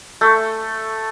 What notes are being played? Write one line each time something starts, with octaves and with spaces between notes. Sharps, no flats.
A3